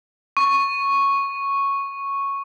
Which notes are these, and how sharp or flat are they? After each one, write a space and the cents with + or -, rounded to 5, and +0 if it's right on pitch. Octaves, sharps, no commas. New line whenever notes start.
C#6 -5